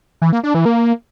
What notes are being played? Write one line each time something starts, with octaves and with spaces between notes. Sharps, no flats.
E3
A#3
D4
E3
A#3